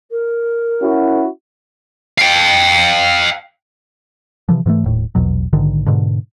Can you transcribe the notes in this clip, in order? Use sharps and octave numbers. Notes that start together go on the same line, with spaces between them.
A#4
C#4 E4 F#4
F5 G5
C3 E3 F3
G#2 E3 G#3 A3
D#1 A2
A#1 E2 B2 F#3
A#1 G#2 D3 D#3
G#2 B2 D3